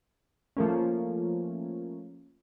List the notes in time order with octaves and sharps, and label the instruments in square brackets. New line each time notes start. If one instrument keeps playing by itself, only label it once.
[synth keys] F3 A3 A#3 C#4